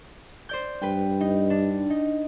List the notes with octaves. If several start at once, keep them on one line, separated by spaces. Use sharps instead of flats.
C5 D5 G6
G2 B4 G5
D#4
D4
D#4